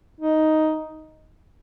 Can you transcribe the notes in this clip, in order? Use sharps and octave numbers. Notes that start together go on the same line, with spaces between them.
D#4